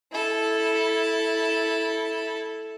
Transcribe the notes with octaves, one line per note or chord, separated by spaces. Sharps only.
E4 A4